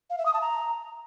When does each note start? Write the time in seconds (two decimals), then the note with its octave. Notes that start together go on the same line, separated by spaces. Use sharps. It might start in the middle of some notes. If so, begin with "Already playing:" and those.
0.10 F5
0.18 E5
0.26 D#6
0.34 A5
0.41 A#5